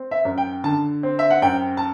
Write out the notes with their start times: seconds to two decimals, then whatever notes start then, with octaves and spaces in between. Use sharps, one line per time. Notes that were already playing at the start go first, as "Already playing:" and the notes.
Already playing: C4
0.11 E5
0.25 F#2
0.38 G5
0.64 D3 A5
1.03 C4
1.19 E5
1.30 F#5
1.42 F#2 G5
1.77 A5